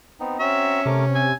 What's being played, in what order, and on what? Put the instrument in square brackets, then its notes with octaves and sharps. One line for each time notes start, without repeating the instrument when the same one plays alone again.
[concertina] B3 C4 D#4
[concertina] C4 F#4 A#5 [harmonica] C#4 [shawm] E5
[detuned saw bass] C3 [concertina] A3 A#4 D6
[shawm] G#5 [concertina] E6